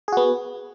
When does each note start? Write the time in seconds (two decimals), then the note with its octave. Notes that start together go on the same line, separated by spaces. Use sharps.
0.08 G#4
0.13 F#4
0.17 B3